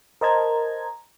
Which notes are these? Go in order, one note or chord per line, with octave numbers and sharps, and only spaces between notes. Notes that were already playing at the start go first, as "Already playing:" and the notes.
A#4 C5 D#5 A5 A#5 G#6